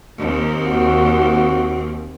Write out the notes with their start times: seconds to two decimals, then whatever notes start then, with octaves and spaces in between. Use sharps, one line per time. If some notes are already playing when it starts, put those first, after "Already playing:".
0.20 D#2 C4
0.65 F#4